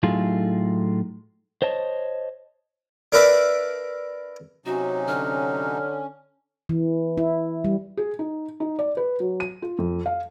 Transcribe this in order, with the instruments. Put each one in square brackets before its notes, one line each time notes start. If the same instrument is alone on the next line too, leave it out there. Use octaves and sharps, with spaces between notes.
[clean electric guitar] A2 F#3 D#4 F4 G#4 A4
C5 C#5 D#5 A5
[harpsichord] D4 A#4 B4 D5 E5
[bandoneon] C3 F#3 D#4 [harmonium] C#4 [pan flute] F#4
[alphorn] D3 [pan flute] F6
[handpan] E3
E4
G3
[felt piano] G#4
D#4
D#4
D5
B4
F#3
D#7
F4
F2
F5